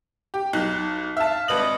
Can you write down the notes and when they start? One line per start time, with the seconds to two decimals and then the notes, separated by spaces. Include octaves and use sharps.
0.34 G4
0.53 B1 D#4 F#6
1.17 E5 F5 A5
1.48 G#1 B4 D#5 F#7